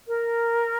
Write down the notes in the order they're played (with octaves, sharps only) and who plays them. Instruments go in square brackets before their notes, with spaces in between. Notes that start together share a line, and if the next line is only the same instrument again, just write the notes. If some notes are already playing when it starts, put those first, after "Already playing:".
[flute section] A#4